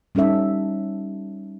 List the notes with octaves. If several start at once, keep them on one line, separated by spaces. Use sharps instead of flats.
G3 C#4 D#4 A4 E5